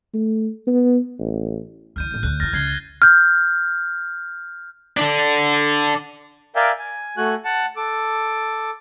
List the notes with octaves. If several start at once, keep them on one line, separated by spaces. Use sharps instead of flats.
A3
B3
A1
D2 E3 F6 G6 D#7
A1 D#2 G6
D2 F#6
F2 E3 F6 A6 A#6
C#2 G#6 C7 G7
A6 G7
F6 G6
D3 D4
A#4 D5 E5 F5 G5 G#5
G#5
A3 F#4 G#5 F#6
F#5 A5
A4 D6